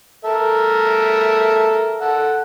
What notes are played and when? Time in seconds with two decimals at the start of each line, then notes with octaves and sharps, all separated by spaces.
0.25 A4 A#4 E5
2.00 A4 F#5